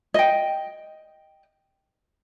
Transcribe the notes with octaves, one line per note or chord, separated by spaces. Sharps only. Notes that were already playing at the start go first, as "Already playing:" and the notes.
D#5 G5